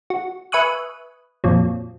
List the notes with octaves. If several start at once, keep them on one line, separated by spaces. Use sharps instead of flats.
F#4
B4 E5 G#5 C#6 D#6 F#6
F2 A#2 F#3